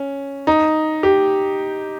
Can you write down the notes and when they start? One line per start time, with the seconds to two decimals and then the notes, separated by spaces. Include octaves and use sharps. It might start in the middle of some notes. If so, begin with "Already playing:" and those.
Already playing: C#4
0.47 D#4
1.03 G4